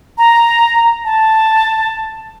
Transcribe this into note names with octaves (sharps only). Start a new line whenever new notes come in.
A#5
A5